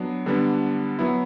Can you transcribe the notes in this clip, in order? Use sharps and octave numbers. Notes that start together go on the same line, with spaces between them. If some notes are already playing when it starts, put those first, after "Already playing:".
Already playing: F#3 B3 D4
D3 G3 B3 D4
F#3 B3 E4